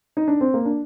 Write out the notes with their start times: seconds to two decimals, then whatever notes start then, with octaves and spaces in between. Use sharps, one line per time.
0.17 D#4
0.28 D4
0.41 C4
0.54 A#3
0.65 D4